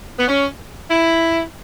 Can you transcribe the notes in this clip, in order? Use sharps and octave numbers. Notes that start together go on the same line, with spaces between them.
B3
C#4
E4